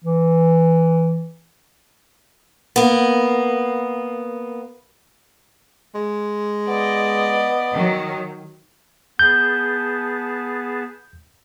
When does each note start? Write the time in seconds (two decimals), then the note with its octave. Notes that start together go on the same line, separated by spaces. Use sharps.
0.04 E3
2.76 A#3 B3
5.95 G#3
6.68 B3 D5 D#5
7.73 D#3 F#3
9.19 B3 G#4 A5 G6